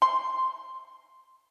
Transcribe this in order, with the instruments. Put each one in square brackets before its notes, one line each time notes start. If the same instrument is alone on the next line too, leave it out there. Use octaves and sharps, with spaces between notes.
[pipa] C6